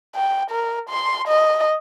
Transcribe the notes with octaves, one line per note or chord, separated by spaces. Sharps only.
G5
A#4
C6
D#5